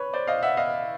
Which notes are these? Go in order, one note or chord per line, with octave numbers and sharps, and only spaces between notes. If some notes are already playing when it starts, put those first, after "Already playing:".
Already playing: B4 C#5
C5 D5
D#5 F5
E5 F#5
D#5 F5